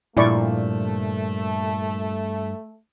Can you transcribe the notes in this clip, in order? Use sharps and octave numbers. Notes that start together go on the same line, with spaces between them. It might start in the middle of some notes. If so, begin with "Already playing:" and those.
G2 A#2 F3 A3 E4 D5 C#6